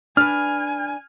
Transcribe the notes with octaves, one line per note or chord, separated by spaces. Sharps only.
D4 B4 G#5 F6